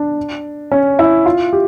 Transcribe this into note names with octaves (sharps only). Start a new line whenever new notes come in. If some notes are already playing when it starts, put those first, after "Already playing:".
Already playing: D4
C#4
E4
F4
G4